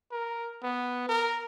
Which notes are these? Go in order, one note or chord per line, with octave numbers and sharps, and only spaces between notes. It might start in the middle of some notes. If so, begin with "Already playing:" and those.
A#4
B3
A#4